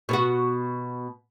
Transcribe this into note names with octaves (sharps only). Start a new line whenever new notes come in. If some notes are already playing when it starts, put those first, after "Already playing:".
B2 B3 F#4